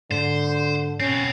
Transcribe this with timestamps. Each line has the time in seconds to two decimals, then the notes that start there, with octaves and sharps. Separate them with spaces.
0.11 G#2 D3 C5
1.00 B2 C4 C#4